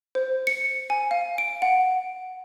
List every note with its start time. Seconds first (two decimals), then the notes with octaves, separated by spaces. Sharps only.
0.15 C5
0.47 C#7
0.90 G#5
1.11 F5
1.38 D7
1.62 F#5